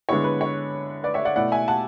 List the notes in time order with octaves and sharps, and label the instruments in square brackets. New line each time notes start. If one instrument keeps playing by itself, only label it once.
[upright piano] D3 G#3 B3 E4 C#5
B4
C#5
B4 D5
C#5 E5
D5 F#5
B2 A3 E4 D5 F#5
E5 G#5
F#5 A5